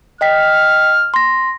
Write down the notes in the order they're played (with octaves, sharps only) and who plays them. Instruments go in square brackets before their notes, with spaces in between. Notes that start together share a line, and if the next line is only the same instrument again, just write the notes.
[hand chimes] D#5 G5 B6 [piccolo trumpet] F6
[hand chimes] C6 A#6